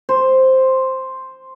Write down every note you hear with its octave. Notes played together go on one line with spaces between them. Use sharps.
C5